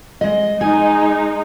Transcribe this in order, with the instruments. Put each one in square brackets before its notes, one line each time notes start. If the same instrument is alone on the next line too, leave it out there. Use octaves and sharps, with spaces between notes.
[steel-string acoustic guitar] G#3 D#5
[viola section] G#3 D#4 [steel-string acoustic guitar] G#5